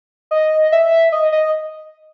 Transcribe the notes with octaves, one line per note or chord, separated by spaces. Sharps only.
D#5
E5
D#5
D#5